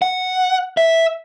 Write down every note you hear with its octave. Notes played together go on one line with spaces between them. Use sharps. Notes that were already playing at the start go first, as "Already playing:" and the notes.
F#5
E5